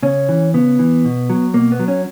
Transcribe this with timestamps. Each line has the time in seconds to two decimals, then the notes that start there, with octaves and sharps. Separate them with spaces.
0.03 C#3 C#4
0.29 E3
0.54 C#3 B3
0.79 E3
1.05 B2
1.30 F#3
1.54 B2 A#3
1.72 B3
1.80 F#3
1.88 C#4